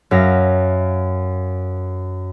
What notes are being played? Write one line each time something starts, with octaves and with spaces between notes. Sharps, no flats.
F#2 E5 F5 A#6